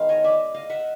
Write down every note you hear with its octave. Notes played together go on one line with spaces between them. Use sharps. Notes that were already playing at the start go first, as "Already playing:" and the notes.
Already playing: D#3 G#3 B3 F5
C#5 D#5
D5 E5
D#5 F5
E5 F#5